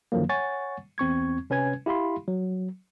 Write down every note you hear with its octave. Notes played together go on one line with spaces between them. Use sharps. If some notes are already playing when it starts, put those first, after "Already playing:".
F#2 D3 D#3 F3 F#3 A#3
C#5 F#5 G#5 C#6 A6
E2 C4 C#6 G#6
C3 C#4 B4 G#5 G#6
E4 G4 F5 B5 C6
F#3